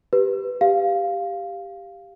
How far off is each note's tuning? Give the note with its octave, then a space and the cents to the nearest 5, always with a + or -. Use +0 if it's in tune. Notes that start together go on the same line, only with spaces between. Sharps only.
G4 +0 B4 +0
G4 +5 F5 +0